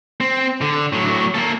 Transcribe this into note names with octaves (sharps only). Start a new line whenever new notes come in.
C4
D3
A2 F#3
A#3 A4